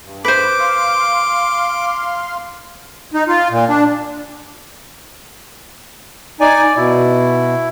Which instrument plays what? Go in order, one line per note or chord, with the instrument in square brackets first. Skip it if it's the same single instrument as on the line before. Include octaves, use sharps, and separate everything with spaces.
[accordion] G2
[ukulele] B4 C5 [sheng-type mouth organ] D6
[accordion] F5 C6
D#4
F4
A#2
D4
[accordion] D#4 G#5 [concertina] D5
[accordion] B2 [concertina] E4